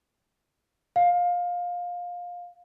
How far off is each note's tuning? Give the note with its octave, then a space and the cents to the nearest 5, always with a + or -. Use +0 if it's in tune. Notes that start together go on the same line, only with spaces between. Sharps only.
F5 +20